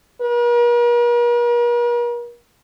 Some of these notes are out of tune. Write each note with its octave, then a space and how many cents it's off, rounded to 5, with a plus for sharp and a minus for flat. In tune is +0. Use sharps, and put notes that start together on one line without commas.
A#4 +45